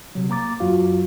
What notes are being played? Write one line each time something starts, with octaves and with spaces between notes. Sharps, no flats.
C3 F#3
A#3 A#5 D6 A6
F#2 F#3 F4 F#4 F5